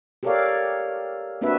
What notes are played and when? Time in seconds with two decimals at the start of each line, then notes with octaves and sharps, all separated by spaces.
0.23 G4 A4 A#4 C#5 D5 F5
1.41 A#3 C4 D4 F#4 B4 E5